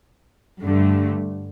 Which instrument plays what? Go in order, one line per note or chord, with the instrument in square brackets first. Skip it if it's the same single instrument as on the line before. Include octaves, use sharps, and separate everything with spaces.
[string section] G2 D3 A3